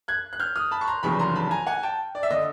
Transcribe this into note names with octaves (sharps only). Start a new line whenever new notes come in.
F#6 G#6
F#6
F6 G6
D#6 F6
A5 B5
C#6
A#5 C6
F1 E2 C#3 F#3 B5 C#6
A#5 C6
A5 B5
G#5 A#5
F#5 G#5
G5 A5
D5
E5
D3 D#5